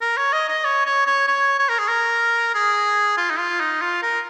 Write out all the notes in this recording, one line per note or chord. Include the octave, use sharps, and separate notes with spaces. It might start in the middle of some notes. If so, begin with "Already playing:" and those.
A#4
C#5
D#5
D#5
C#5
C#5
C#5
C#5
C#5
A#4
G#4
A#4
G#4
F4
D#4
F4
D#4
F4
A#4